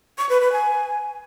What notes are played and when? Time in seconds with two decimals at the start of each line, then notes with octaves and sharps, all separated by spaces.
0.18 C#6
0.29 B4
0.41 B4
0.52 G#5